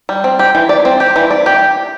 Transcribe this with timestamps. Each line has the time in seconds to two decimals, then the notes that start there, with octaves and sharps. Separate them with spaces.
0.09 G3
0.24 C4
0.39 G4
0.55 E3
0.69 D5
0.85 C4
1.00 G4
1.16 E3
1.31 D5
1.46 G4